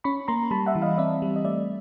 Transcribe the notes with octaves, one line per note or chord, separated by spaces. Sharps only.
C#4 B5 C#6
A#3 A#5 C6
G3 A5 B5
E5 F#5
E3
D#5 F5
C4 D5 E5
G3
D#5
A3 D5 E5